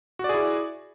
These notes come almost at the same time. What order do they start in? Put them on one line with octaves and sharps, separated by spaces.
F#4 D5 G#4 E4